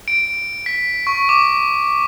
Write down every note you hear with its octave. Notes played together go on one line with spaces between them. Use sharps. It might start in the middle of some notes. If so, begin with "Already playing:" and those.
D7
B6
C#6
D6